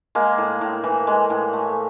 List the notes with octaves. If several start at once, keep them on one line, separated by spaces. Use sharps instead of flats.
G#3 A#3
A2
A2
E3
G#3
A2
A3